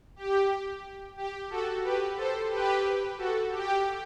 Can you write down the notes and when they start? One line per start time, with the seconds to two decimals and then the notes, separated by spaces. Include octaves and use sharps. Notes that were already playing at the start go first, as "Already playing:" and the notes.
0.16 G4
1.17 G4
1.50 F#4 A4
1.83 G4 B4
2.17 A4 C5
2.51 G4 B4
3.18 F#4 A4
3.51 G4